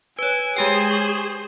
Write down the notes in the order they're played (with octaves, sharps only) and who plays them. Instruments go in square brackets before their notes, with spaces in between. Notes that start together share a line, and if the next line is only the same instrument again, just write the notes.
[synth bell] B4 C#5 [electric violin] G#5
[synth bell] G#3 G4 G5 [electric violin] G#4 C5
[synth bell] C#6